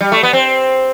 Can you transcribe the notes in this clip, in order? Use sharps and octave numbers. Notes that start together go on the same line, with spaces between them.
G3
A3
B3
C4